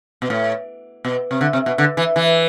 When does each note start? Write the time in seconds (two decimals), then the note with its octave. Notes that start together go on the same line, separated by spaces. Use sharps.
0.22 B2
0.30 A2
1.05 B2
1.31 C3
1.41 D3
1.53 C3
1.66 B2
1.78 D3
1.97 E3
2.16 E3